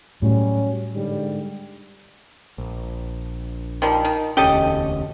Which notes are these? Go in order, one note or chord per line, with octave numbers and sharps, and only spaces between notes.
A2 F#3 G3 C#4
G#2 D3 G3
A#1
D#3 F3 G3
D#3
E1 D2 C#4 G4 A4 D#5